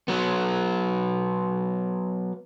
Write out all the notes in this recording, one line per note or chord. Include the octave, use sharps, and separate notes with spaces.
F#3 B3